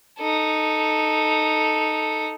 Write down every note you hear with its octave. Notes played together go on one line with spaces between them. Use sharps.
D#4 A4